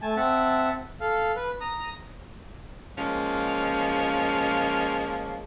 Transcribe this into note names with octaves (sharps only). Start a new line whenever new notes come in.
A3 G#5 A5
C4 E5 F#5 A5
A4 F5
B4
A#5 D#6
F3 G#3 A#3 C#4